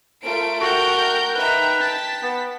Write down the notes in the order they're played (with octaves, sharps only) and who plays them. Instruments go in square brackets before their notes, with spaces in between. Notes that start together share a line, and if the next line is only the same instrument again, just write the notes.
[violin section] A3 D7 [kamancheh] F4 A#4
[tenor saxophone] F#4 [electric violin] A#4 G6 [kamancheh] F#5 G5
[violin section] D#4 E5 A#5 [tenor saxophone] B4 [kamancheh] G5
[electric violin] A5 [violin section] B6
[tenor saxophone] B3